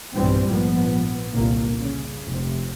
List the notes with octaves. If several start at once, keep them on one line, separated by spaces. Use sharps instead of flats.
B1 G2 A#2 E3 G3 C4
A#1 G#2 F3 B3
G1 C2 A#2 A#3
C#3
F1 C3